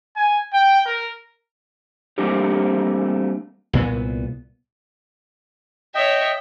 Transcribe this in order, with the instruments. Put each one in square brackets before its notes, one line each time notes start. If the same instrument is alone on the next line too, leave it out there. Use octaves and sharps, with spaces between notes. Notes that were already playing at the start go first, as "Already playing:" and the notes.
[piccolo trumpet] G#5
G5
A#4
[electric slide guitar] G3 A3 A#3 C4 D4 G4
[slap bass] C2 A#2 B3
[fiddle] C#5 E5 [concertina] D#5 G5